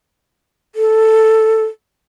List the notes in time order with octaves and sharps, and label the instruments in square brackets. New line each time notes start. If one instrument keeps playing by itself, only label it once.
[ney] A4